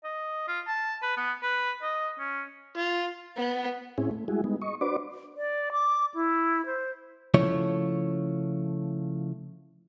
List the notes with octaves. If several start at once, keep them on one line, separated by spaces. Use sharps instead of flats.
D#5
F4
A5
B4
B3
B4
D#5
C#4
F4
B3
A2 C4 C#4 E4 G#4
A3
G3 G#3 E4 F#4 G#4
G3 G#3 B3 D#4
D#5 C#6
D4 F#4 B4 C5 D5 D6
D5
D6
E4
C5
C#3 F3 A3 E4 C#5